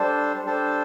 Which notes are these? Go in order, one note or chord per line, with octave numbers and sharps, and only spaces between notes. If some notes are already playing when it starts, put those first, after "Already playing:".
Already playing: G3 D4 A4 C5
G3 D4 A4 C5